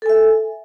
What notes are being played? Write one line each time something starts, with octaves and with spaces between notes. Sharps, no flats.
A4 E5 G#5